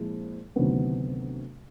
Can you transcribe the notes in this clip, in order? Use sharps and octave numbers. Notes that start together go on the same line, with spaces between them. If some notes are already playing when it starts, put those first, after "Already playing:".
Already playing: A#2 F3 G#3 C4 E4
D2 C3 D#3 F#3 B3